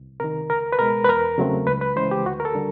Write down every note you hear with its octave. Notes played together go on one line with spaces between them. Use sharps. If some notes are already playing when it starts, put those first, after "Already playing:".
Already playing: C2
C3 D#3 A#4
C#2 A#4
B4
B2 G#3 A#4
B4
E2 A#4
C#3 F#3 A3 C4
C#2 B4
B4
C#3 E3 G#3 C5
G4
D2 F#4
A#4
A4
D3 G3